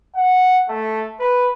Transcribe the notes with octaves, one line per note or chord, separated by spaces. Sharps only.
F#5
A3
B4